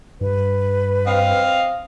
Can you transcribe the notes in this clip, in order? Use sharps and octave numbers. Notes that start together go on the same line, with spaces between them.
G2 B4
C4 D#5 F5